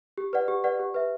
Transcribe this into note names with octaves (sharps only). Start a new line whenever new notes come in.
G4
B4 D5 F#5
G4
B4 D5 F#5
G4
B4 E5